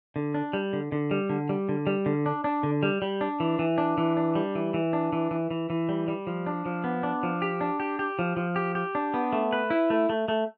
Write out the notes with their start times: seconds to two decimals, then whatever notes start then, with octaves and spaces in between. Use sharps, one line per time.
0.16 D3
0.34 D4
0.53 G3
0.73 D3
0.92 D3
1.11 G3
1.29 D3
1.49 G3
1.69 D3
1.87 G3
2.06 D3
2.26 D4
2.44 D4
2.63 D3
2.83 G3
3.02 G3
3.21 D4
3.40 E3
3.59 E3
3.78 D4
3.98 E3
4.17 D4
4.35 G3
4.55 E3
4.74 E3
4.93 D4
5.13 E3
5.31 E3
5.51 E3
5.70 E3
5.89 G3
6.08 G3
6.27 F3
6.47 D4
6.66 F3
6.84 B3
7.03 D4
7.23 F3
7.42 G4
7.61 D4
7.80 G4
7.99 G4
8.19 F3
8.37 F3
8.56 G4
8.75 G4
8.95 D4
9.14 B3
9.33 A3
9.53 B4
9.70 E4
9.90 A3
10.10 A3
10.28 A3